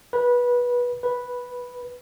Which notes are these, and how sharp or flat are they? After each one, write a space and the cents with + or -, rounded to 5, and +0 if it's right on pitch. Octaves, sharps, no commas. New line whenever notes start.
B4 -20
B4 -5